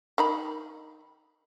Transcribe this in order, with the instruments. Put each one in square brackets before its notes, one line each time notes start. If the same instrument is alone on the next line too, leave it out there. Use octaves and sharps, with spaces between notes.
[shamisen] D#3 D#4 B5